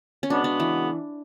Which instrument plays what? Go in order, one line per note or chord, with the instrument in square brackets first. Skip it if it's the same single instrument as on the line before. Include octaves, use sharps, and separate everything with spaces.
[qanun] C#4
[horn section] C#3 G#3 B3 F#4 [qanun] D4
[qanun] D4
E3